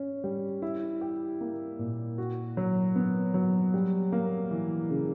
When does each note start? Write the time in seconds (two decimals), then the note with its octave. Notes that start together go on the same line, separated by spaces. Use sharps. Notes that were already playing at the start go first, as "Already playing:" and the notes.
Already playing: C#4
0.24 G3
0.62 E4
1.01 G4
1.41 A#3
1.79 A#2
2.18 F#4
2.57 F#3
2.96 B3
3.34 F#3
3.74 G3
4.12 A#3
4.51 E3
4.90 C#3